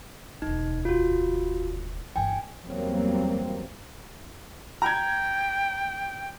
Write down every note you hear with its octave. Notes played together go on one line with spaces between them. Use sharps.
E1 D2 D#4
F4 F#4
G1 E3 G5 G#5
E2 F#3 G3 A#3 C4
G5 A#5 G#6